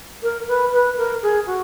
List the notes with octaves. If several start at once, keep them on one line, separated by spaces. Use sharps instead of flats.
A#4
B4
B4
A#4
G#4
F#4